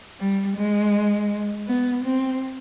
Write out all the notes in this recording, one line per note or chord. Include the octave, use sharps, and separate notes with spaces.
G3
G#3
B3
C4